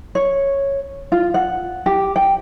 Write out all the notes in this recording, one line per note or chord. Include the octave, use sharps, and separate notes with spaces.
C#5
F4
F#5
G4
G5